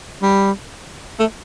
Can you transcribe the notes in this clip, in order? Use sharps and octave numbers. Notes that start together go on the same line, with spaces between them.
G3
A3